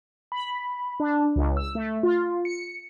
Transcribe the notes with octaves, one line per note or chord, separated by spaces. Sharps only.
B5
D4
C#2
E6
A3
F4
C#7